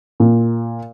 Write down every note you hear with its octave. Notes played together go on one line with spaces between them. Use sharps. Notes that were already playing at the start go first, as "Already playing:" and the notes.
A#2